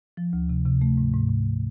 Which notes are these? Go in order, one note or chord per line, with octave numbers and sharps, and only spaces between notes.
F3
D2
C3
C3
A3
G#2
G#2
G#2